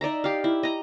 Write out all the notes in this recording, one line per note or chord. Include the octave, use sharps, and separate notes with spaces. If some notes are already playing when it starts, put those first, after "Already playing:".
D#4 D5 E5 A#5
G4 F5
E4
D#5 A#5